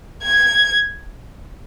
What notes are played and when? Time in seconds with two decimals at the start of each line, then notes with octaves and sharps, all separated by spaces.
0.24 G#6